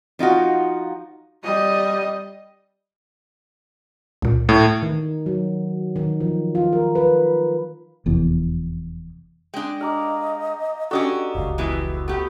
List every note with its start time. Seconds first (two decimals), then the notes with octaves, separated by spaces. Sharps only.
0.19 F3 D#4 F4 F#4
1.44 G3 D#5
4.22 C#2 A#2
4.49 A2
4.82 D#3
5.26 F#3
5.96 D#3
6.20 F3
6.55 F4
6.73 A#4
6.95 B4
8.06 F1 E2
9.54 G#3 D4 G5
9.81 D#5 F5 A#5 D6
10.91 C#4 D4 F#4 G4 A4 D#5 G5
11.35 F1 C#2 F5
11.58 E3 G#3 B3 E4
12.08 A3 B3 G4